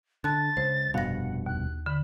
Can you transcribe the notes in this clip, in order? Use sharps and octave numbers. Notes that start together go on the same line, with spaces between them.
D3 A5 F#6 A6
C#2 C5
F1 G2 B2 F5 F#5 A#6
D#2 F#6
D3 B5